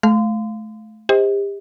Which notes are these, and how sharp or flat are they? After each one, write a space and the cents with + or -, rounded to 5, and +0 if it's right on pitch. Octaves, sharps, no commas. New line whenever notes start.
A3 -30 F5 +0 C6 -30
G4 +35 C5 +0 D#5 +35